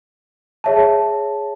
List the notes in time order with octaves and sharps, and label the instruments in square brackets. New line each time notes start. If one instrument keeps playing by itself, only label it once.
[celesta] G#4 C#5 E5 A5